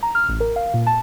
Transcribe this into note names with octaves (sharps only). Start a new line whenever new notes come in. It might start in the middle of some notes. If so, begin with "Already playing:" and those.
A#5
F6
A1
A#4
F5
A#2
A5